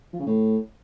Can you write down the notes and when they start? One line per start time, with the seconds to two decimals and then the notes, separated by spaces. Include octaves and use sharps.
0.13 F3
0.20 C#3
0.26 A2